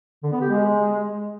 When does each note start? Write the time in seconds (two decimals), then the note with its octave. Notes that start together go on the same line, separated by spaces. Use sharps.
0.23 D3
0.32 B3
0.41 G4
0.50 G#3